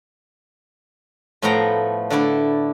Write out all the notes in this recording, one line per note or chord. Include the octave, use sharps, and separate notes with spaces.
A2 F3 A3 B3 G5 A#5
D3 A3 D4 E4 A4